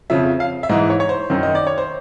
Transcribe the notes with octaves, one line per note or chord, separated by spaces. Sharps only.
F2 C#3 F3 E5
F5
E5
G#2 E3 D#5
C#5
C#5
C5
F#2 D#3
D#5
D5
C#5
C5